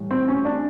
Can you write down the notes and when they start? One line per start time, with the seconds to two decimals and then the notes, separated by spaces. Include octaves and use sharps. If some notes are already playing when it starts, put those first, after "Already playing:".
Already playing: A2 E3 G3
0.11 C4
0.28 C#4
0.45 D4